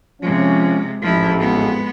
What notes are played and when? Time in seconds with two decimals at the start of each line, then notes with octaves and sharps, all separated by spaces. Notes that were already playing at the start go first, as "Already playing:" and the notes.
0.22 C3 F3 G#3 C#4
1.02 A1 F2 G#2 F3 E4
1.39 G#3 B3